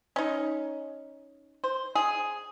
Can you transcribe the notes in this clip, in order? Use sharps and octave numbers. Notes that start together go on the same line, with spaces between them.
C#4 D#4
C5
G#4